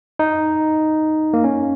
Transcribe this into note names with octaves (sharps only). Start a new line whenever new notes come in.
D#4
A#3
C#4